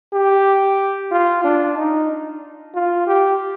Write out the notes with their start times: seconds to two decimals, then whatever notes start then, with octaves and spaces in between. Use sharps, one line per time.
0.14 G4
1.12 F4
1.44 D4
1.77 D#4
2.75 F4
3.07 G4